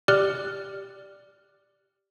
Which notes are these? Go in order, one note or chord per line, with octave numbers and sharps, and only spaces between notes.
G4 D5 F6 F#6